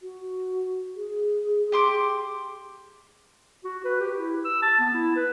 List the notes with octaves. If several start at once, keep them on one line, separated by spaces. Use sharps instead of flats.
F#4
G#4
G4 C6 D6
F#4
B4
G4
E4
E6
A5
B3
E4
B4